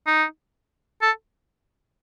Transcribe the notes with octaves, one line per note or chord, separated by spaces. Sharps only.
D#4
A4